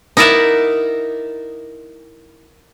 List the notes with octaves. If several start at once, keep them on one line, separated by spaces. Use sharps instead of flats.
D#4 E4 A#4 D5 E5 F#5